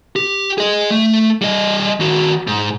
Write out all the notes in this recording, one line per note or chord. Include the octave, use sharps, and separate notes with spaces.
G4
G#4 D#5
A3
G3 D#5
D#3 F#4
G#2